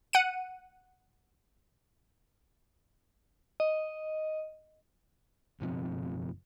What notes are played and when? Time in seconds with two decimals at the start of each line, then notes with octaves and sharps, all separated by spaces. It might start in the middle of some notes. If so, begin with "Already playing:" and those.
0.13 F#5 C#7 D#7
3.60 D#5
5.60 F#1 B2 F3 C4